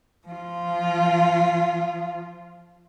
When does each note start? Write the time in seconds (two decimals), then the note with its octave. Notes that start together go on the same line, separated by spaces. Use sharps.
0.27 F3 F4